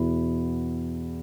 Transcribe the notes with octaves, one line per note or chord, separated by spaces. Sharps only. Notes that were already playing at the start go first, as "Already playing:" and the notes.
Already playing: E2 B2 B3 E4